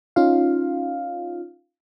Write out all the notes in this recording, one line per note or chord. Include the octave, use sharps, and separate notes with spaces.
C#4 D#4 F4 F5